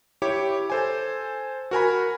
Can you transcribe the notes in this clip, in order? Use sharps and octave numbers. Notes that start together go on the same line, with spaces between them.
E4 G4 C#5 D6
A4 C5 G#5
F#4 A#4 G#5 B5